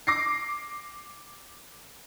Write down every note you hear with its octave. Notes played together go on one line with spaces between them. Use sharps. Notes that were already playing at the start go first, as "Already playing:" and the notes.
D6 A#6 C7